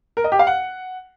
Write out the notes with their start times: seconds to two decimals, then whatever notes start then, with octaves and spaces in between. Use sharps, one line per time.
0.17 A#4
0.24 D#5
0.32 G4
0.39 F5
0.47 F#5